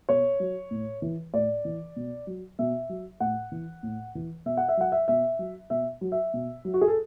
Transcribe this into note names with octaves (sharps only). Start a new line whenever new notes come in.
B2 C#5
F#3
A2
E3
A2 D5
E3
B2
F#3
B2 E5
F#3
A2 F#5
E3
A2
E3
B2 E5
F#5
E5
F#3 F#5
E5
B2 E5
F#3
B2 E5
F#3
E5
B2
F#3
F#4
G#4
A4